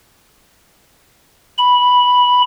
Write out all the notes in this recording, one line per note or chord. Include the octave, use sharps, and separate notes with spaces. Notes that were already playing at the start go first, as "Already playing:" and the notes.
B5